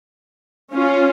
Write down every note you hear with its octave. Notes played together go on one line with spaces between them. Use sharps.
C#4 F4